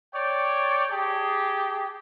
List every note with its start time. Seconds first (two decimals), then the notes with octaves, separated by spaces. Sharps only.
0.14 C#5 D5 G5
0.91 G4 G#4 A5